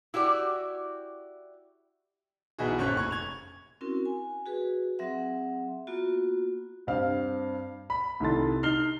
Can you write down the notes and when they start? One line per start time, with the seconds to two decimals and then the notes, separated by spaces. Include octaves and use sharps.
0.14 E4 F#4 G4 D5
2.58 B1 E3 B3 E4 F#4 G#4
2.78 G1 A#2 C#4 C5 C#6 F#6
2.95 F1 C#6 G#6
3.11 G#6 F7
3.81 C4 C#4 E4 F#4 A#4
4.05 G#5
4.46 F#4 G#4 B4
4.99 F#3 C4 G#4 E5 F#5
5.87 A#3 B3 F4 F#4
6.87 G2 C4 F5
7.90 B5
8.20 C2 D#3 E4 A4 C6 A6
8.63 D#4 F6 C7 G7